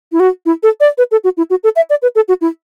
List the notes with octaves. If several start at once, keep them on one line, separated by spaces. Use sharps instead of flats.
E4
F#4
E4
A4
D5
B4
A4
F#4
E4
F#4
A4
E5
D5
B4
A4
F#4
E4